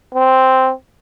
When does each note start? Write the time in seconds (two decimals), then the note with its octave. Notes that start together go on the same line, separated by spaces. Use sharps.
0.14 C4